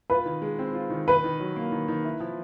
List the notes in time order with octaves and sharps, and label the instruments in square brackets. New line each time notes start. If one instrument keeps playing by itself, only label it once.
[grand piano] F4 [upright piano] B4
[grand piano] D#3
G#3
C4
F4
D#3
[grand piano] D#3 [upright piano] B4
[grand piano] D#3
F#3
A#3
D#3
D#3
E4
F3